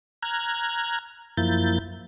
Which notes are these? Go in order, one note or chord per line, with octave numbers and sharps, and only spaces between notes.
A#5 F6 F#6 G#6
F#2 F3 A#3 E4 G6 A6